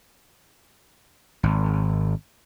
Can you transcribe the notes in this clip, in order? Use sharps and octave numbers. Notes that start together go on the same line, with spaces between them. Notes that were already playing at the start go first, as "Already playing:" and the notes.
G#1